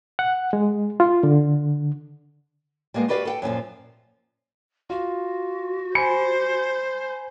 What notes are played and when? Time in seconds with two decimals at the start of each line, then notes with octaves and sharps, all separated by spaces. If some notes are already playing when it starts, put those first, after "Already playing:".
0.19 F#5
0.53 G#3
1.00 F4
1.23 D3
2.94 G3 G#3 A#3 B3
3.08 F#4 G4 B4 D5 E5 F5
3.25 A4 F#5 G5
3.42 F#2 A#2 E3 F3
4.90 F4 F#4
5.95 C5 G#5 B5 C#7